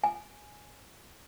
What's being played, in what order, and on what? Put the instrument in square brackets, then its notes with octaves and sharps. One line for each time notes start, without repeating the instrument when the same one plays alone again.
[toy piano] G#5